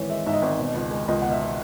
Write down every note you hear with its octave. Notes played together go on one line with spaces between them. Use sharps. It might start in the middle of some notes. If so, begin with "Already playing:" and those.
Already playing: G#1 G#2 E3 C#5
G#3 E5
G#2 E5
D#5
G#1
B2
C#2
G#3
C#2 D#5
B2 F#5
E5